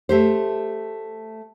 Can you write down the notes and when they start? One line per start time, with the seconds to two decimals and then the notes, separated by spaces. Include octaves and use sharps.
0.09 A3 G4 C5